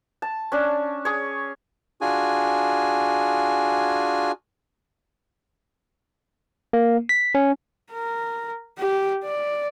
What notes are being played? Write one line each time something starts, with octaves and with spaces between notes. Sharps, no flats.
A5
C#4 D4
G#4 C#5
D4 F4 F#4 G#4 G#5
A#3
B6
C#4
A#4
G4
D5